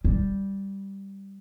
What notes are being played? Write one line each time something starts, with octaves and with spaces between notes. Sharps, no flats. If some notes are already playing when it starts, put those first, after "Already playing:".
G3